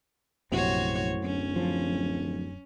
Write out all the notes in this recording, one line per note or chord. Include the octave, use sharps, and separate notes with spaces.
A#1 F#2 A2 C3 F#4 C5 C#5
D1 C#4
F3